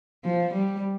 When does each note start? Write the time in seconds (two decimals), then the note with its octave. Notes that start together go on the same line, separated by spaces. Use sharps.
0.24 F3
0.53 G3